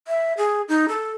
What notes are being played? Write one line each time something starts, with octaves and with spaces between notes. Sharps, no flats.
E5
G#4
D#4
A4